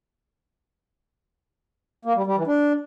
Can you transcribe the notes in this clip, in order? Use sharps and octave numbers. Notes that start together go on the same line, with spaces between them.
A#3
G3
G3
E3
D4